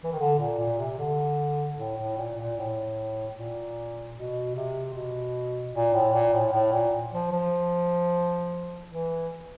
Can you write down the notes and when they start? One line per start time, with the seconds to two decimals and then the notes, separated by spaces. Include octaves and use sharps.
0.04 E3
0.12 D#3
0.19 D3
0.38 A#2
0.59 A#2
0.78 C3
0.98 D3
1.77 A2
1.98 A2
2.17 A#2
2.37 A#2
2.57 A2
3.36 A#2
4.15 B2
4.55 C3
4.94 B2
5.73 A#2
5.94 A2
6.13 A#2
6.33 A2
6.53 A2
6.72 A#2
7.12 F3
7.32 F3
8.91 E3